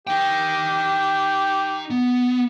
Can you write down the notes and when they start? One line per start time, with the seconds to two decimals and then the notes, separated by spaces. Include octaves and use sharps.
0.07 D#4 G4 G5
1.90 B3